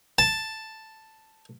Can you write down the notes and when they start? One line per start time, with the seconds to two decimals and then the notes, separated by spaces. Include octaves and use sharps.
0.18 A5